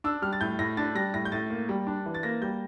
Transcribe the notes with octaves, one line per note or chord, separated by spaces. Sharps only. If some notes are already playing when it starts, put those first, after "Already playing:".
D4 E6
G3 F6
A6
A2 G6
A2 A#6
D4 A6
G3 A#6
A2 A#6
G6
A2 A6
A#3
G3
D4
E3
A6
A#3 A#6
G3 G6